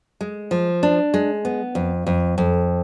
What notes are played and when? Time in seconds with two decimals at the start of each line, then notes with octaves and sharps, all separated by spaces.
0.21 G#3
0.51 F3
0.83 D4
1.14 G#3
1.45 B3
1.75 F2
2.06 F2
2.38 F2